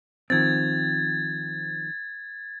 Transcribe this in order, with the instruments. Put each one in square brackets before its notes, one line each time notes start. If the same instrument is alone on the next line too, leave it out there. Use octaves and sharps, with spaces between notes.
[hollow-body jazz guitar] D#3 F3 C4 [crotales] G#6 A6